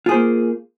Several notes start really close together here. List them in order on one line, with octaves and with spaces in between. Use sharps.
F4 G#4 C5 A#3